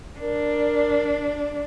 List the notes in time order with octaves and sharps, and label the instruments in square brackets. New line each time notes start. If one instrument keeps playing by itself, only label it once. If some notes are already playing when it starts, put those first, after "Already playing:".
[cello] D4 [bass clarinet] A#4